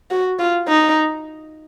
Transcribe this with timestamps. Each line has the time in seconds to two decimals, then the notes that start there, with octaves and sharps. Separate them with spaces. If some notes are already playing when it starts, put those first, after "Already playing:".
0.11 F#4
0.39 F4
0.68 D#4